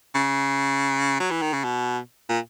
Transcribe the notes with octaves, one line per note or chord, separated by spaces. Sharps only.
C#3
F#3
E3
D#3
C#3
B2
A#2